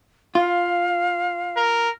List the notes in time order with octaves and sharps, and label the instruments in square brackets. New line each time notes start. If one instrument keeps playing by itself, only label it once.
[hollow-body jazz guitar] F4 [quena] F5
[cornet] A#4